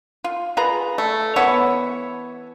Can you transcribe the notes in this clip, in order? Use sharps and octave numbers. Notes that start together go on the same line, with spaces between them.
F4
F4 G#4 B4 A#5
A3
E3 B3 C#5 E5